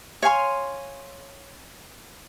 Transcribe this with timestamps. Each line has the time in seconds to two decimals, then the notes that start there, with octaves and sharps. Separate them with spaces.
0.22 C#5 F5 G#5 C6